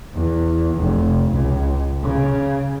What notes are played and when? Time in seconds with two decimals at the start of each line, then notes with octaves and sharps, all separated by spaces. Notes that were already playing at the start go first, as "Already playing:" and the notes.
0.14 E2
0.77 F1
1.31 C#2
2.02 C#3